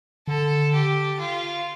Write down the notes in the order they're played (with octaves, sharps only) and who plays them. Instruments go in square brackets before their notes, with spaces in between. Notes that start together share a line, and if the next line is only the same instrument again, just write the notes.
[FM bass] D3 [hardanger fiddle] A4
[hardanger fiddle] G4
F4